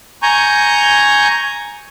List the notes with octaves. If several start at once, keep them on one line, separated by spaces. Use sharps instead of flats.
G#5 A#5 C#6 G6